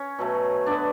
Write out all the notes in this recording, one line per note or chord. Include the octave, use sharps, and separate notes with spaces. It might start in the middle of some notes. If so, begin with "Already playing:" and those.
Already playing: C#4 C#5
B2 F#3 A3
D3 F#3 B3 D4 D5